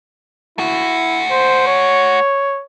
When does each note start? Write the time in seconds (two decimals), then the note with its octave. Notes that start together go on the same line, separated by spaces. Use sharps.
0.58 A3 E4 F#4
1.31 C5
1.67 C#5